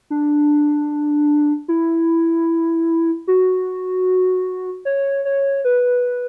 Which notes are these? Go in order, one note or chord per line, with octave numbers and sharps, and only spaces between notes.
D4
E4
F#4
C#5
C#5
B4